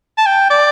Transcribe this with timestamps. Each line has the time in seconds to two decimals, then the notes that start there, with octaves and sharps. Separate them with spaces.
0.18 A5
0.26 G5
0.50 D5